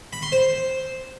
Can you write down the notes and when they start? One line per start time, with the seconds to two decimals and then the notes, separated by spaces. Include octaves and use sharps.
0.13 B5
0.22 C6
0.32 C5